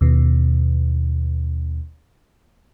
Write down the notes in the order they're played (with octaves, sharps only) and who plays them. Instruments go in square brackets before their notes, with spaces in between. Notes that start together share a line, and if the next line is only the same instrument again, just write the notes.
[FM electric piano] D#2 B2